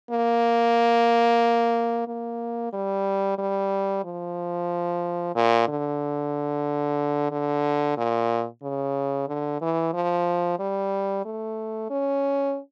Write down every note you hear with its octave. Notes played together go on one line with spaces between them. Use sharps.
A#3
A#3
G3
G3
F3
A#2
D3
D3
A#2
C#3
D3
E3
F3
G3
A3
C#4